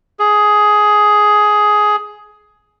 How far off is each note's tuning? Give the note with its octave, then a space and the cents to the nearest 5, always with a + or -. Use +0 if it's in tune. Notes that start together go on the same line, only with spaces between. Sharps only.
G#4 +10